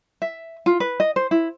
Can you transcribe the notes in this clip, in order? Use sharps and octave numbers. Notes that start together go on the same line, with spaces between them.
E5
F4
B4
D#5
C5
E4